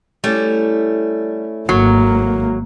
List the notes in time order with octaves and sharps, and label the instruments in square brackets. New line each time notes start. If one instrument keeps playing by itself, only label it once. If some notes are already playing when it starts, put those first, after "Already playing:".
[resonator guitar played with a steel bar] G3 [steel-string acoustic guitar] A3 C#4 E4
[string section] G#1 A#3 [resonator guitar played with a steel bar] F#3